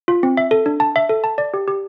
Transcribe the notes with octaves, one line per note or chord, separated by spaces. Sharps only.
F4
C4
E5
A4
D4
A5
E5
A4
A5
D5
G4
G4